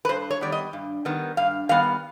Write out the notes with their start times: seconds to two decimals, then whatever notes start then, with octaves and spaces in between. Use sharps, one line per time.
0.05 B4
0.09 G2 C5
0.31 C#5
0.41 D#3 G3 B3 D5
0.52 D#5
0.73 G2
1.05 D#3 G3 B3
1.37 G2 F5
1.69 D#3 G3 B3 F5